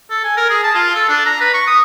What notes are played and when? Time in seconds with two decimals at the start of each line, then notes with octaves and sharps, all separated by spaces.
0.10 A4
0.24 G#5
0.37 A#4
0.50 G#4
0.63 A5
0.75 F4
0.95 A4
1.09 D4
1.26 A#5
1.41 B4
1.54 C#6
1.67 D#6